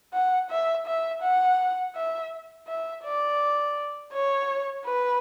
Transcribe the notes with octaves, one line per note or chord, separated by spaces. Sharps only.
F#5
E5
E5
F#5
E5
E5
D5
C#5
B4